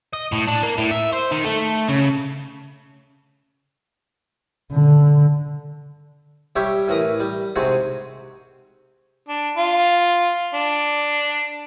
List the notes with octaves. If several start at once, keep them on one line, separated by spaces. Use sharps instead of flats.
D#5
A2
D4
A#3
A2
E5
C5
D#3
A3
C#3
D3
G3 G4 C#5 E5
A2 E3 A#4 D#6
G3
G#2 C3 C4 F#4 G#4
D4
F4
D4